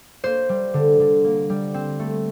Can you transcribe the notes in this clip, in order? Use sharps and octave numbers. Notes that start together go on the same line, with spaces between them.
A#3 C5
G3
D3
D3
A#3
G3
C4
A3